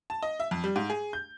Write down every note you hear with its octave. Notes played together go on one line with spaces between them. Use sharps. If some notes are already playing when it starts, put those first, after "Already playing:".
A5
D#5
E5
F2
G3
G#2
G#4
G6